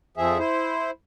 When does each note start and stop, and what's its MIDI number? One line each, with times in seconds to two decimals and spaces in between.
0.17 0.38 41
0.17 0.38 53
0.17 0.38 68
0.17 0.38 76
0.39 0.91 64
0.39 0.91 72